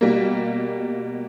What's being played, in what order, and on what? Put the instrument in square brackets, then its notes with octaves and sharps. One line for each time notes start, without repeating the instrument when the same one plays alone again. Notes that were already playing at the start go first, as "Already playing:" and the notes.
[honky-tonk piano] B2 G3 A#3